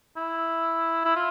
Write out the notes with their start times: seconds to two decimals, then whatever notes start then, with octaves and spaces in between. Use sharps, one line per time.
0.17 E4
1.05 E4
1.16 F4